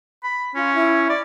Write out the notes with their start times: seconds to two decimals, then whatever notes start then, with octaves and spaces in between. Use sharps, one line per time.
0.24 B5
0.55 C#4 F4
0.75 E4
1.10 D5